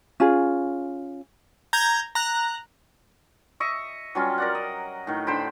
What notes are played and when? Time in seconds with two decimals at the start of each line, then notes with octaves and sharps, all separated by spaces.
0.20 C#4 F4 G#4
1.73 A#5 G6 G#6
2.15 A#5 F#6
3.60 D#5 E5 C#6
4.15 F#3 G3 C#4 F4
4.38 A#4 D5 F#5
4.55 D#5
5.07 A2 D#3
5.27 D3 C5 G5 B5